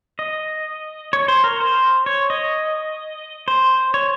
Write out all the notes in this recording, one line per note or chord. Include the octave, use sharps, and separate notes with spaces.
D#5
C#5
C5
A#4
C5
C#5
D#5
C5
C#5